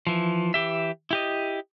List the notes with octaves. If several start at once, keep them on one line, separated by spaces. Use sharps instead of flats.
E3 F3
E3 G4 E5
E4 G4 D#5